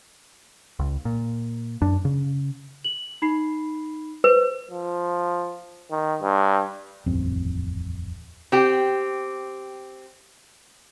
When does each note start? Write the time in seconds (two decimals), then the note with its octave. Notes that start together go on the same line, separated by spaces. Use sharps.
0.79 C#2
1.05 A#2
1.82 F#2 D4
2.05 C#3
2.84 F#7
3.22 D#4 B5 C7
4.24 B4 C5
4.71 F3
5.91 D#3
6.22 G2
7.06 D#1 A1 F2 C4
8.52 C4 G4